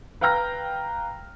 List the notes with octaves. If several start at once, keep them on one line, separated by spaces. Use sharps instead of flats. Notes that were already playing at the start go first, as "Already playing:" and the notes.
B4 F5 G5 A#5 F6 A#6